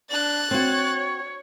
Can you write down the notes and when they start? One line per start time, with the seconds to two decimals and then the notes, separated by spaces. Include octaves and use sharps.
0.11 D4 F#6 A6
0.51 C4 F#4 C#5